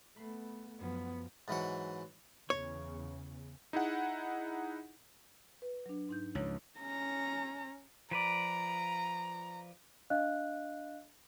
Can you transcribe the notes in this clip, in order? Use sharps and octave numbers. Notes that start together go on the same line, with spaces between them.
A3 B3 B5 C7
F#2 F3 F#3 B3
G#2 E3 F#3 F#5
E2 C#3 C#5
D#4 E4 G#4 F#5
B4
F#3 D4
G#2 D#4 G6
C#2 F3 C#5
C#4 A#5
F3 B4 D5 A#5
D4 D#5 F5 F#6